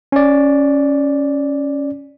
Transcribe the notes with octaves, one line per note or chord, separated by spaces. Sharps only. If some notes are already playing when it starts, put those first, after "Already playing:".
C#4 D5